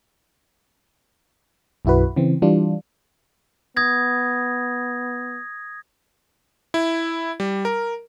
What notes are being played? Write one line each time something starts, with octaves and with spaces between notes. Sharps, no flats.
B1 F#2 E4 F#4 B4
C#3 E3 C4
E3 G3 D4 F4
B3 D#6 G#6 A#6
E4
G3
A#4